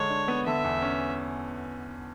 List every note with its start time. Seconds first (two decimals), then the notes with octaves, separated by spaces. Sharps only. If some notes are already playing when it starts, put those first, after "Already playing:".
Already playing: D3 G#3 C#5
0.10 D4
0.28 B3
0.46 D3 E5
0.64 E2
0.82 C#4